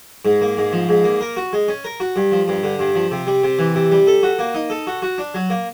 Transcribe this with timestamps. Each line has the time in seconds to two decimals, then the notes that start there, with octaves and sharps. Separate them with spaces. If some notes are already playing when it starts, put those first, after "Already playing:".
0.25 G#2
0.41 A#3
0.57 G#2
0.73 F3
0.89 G#2
1.04 A#3
1.21 A#4
1.37 F#4
1.53 G#3
1.68 C#4
1.84 A#4
2.00 F#4
2.16 G2
2.32 F3
2.48 G2
2.63 D3
2.79 G2
2.95 F3
3.11 C3
3.27 G3
3.44 C3
3.59 E3
3.75 C3
3.91 G3
4.07 A4
4.23 F#4
4.39 A#3
4.55 D#4
4.70 A4
4.87 F#4
5.02 F#4
5.18 D4
5.34 F#3
5.50 A#3